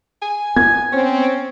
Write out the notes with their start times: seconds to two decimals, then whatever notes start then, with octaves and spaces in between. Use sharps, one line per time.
0.22 G#5
0.56 B3 G#6
0.93 C4 C#4